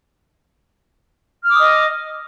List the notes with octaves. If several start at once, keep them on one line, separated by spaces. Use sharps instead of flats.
D#5 D6 D#6 F6